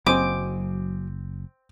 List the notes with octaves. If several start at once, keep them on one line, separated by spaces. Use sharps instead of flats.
F#1 F#3 C4 D#5 G#5 D6